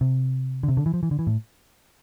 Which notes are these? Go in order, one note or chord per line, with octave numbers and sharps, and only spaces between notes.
C3
D3
C3
D3
E3
F3
E3
D3
E3
A2